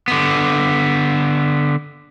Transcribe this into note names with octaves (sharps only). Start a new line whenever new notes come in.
D3 B3